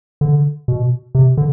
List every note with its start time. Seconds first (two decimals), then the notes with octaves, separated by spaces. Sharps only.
0.21 D3
0.68 B2
1.15 C3
1.37 D3